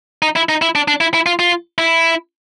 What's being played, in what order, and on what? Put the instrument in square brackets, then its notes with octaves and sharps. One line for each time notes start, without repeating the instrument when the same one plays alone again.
[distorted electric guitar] D#4
E4
D#4
E4
D4
D4
E4
E4
F4
F4
E4